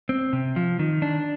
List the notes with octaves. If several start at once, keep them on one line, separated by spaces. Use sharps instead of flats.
C4
C3
F3
D#3
D4